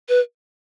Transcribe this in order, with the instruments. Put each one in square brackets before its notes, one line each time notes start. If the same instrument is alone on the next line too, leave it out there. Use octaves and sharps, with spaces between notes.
[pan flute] B4